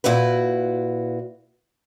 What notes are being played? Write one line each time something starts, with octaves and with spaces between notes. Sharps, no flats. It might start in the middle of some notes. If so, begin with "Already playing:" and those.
A#2 E4 F#4 B4